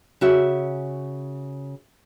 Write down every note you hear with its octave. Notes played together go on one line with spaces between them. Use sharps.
C#3 F#4 E5